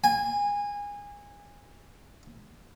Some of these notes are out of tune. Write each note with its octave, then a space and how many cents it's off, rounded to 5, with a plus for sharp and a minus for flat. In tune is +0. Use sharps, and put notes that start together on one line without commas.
G#5 -25